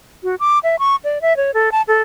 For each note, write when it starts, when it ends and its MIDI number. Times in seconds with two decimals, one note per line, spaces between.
0.24 0.35 66
0.40 0.59 86
0.64 0.76 76
0.79 0.96 85
1.04 1.21 74
1.22 1.36 76
1.37 1.51 73
1.54 1.69 69
1.72 1.82 81
1.88 2.02 69